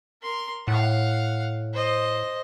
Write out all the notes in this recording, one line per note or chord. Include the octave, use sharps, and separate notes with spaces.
A#4 C6
A2 F5 F#5
C5 D#5